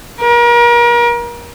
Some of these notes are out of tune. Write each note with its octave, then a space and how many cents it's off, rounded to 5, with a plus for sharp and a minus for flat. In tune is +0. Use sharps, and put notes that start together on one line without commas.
A#4 +35